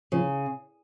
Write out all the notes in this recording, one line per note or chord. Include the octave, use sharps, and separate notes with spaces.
C#3 F3